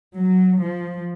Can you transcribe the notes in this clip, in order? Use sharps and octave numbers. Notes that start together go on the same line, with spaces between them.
F#3
F3